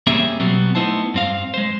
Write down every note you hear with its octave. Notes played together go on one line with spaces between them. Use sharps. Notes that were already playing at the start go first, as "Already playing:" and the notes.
G3 A#3 C4 C#4 G#4 E5
B2 F#3 G3 B3 C4
A3 B3 D#4 E4 C5 A5
G2 C4 F5
G#3 C5